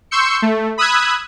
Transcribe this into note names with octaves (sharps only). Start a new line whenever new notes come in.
C6 C#6 E6 G6 C#7
A3
B5 D#6 E6 F#6 G#6